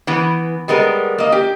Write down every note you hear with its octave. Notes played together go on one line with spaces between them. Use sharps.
E3 B3
G3 G#3 B3 A#4
A#3 D#5
G4